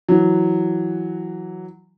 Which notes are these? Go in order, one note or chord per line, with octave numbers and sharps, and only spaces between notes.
E3 F#3